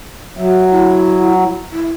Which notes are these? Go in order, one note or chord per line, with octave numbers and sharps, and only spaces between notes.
F#3 E5
E4
E4